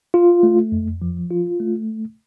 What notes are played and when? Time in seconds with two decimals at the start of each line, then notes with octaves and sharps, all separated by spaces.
0.14 F4
0.43 A3
0.72 F2
1.02 F3
1.31 F4
1.60 A3